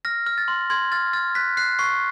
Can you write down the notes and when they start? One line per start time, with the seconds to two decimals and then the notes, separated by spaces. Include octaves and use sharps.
0.05 F6 A#6
0.26 F6
0.38 A6
0.48 C6
0.70 C6 G#6
0.92 F6 A6
1.13 F6 A6
1.35 F#6 B6
1.57 F#6 C7
1.79 C#6 C7